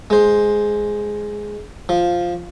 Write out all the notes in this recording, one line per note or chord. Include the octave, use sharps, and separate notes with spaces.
G#3 C5
F3